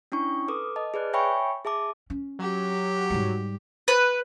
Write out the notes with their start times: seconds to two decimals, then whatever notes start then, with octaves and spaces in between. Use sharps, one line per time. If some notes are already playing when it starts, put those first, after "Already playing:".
0.12 C#4 D4 E4 C#6
0.48 A4 B4 D6 D#6
0.76 D#5 A5
0.94 G#4 B4 D5 F#6
1.13 C#5 E5 G5 G#5 B5 C#6
1.65 G#4 E5 A5 D6
2.10 C#4
2.39 F#3 G4
3.10 G#2 G3
3.88 B4